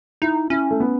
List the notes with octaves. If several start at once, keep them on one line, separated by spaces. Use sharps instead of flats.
D#4 E4
C#4 E4
A3
B3